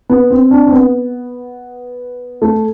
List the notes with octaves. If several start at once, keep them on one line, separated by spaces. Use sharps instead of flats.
B3
C4
D4
C4
B3
A3